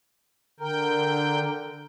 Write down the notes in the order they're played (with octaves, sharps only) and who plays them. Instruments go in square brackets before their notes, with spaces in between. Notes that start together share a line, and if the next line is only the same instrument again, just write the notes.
[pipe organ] D3 G5 [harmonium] A#4